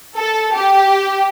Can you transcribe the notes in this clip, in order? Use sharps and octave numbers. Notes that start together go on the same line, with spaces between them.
A4
G4